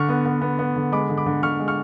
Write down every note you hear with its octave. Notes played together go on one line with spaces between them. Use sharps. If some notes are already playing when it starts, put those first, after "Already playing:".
Already playing: D3 C#6 F6
B3
B3
B3
B3
D3
G#3 B5 D6
D3
B5 D6
D3
D3 C#6 F6
G#3
C#6 F6